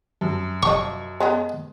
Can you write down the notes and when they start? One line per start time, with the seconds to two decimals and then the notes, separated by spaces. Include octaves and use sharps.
0.21 F#2
0.63 F3 D#5 C#6
1.20 G#3 B3 D#5